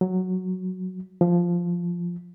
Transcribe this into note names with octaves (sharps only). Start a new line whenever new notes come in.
F#3
F3